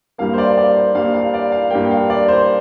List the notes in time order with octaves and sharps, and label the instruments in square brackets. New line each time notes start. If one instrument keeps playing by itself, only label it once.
[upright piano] G2 G3 A#3 F5
C5
D5
D5
C5
G2 G3 A#3 F5
F5
D5
F5
G2 G3 A#3 G5
F5
D5
C5